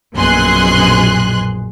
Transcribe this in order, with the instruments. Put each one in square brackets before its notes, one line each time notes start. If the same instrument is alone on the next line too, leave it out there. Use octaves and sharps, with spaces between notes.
[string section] A#1 F#2 B2 G#4 C6 F#6